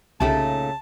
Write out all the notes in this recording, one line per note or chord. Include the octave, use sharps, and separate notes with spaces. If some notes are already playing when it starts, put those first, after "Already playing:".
C2 A#2 C#3 A3 D#4 G4 A5